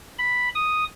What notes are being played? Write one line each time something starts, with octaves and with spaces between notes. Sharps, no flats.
B5
D#6